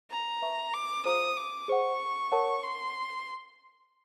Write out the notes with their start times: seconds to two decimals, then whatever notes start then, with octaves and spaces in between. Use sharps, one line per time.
0.10 A#5
0.42 B4 E5 A5 C#6
0.74 D6
1.05 F4 G#4 C5 F5 A#5 D#6
1.37 D6
1.68 G#4 C5 D#5 F#5 C#6
2.32 A#4 C#5 F#5 A5
2.63 C6